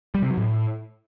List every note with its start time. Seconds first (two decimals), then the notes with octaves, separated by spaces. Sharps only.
0.15 G3
0.22 C3
0.30 F#3
0.37 A2